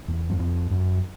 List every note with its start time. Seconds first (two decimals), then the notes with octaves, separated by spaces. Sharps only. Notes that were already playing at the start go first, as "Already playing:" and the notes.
0.08 E2
0.30 F#2
0.39 F2
0.70 F#2